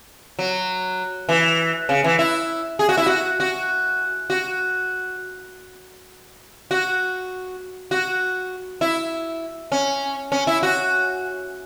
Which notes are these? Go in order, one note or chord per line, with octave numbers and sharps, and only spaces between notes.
F#3
E3
C#3
E3
E4
G#4
F#4
E4
F#4
F#4
F#4
F#4
F#4
E4
C#4
C#4
E4
F#4